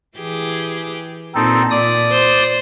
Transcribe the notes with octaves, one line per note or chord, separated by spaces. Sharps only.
E3 G4 G#4
A#2 C4 D#4 A4
A#2 D5 D#6
C5